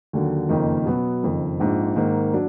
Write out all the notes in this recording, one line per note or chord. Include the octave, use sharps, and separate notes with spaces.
D#2 D3 F#3
F#1 F2 D#3 A#3 D#4
B2 F#3 B3
F#1 F2 D#3
A#1 G#2 F3
G#2 D#3 A#3
F#3 D4